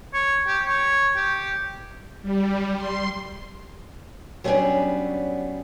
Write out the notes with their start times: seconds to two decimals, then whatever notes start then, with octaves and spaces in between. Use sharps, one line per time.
0.14 C#5
0.47 G4
0.66 C#5
1.16 G4
2.22 G3
2.76 C6
4.44 F#3 G3 A3 B3 C#4 D4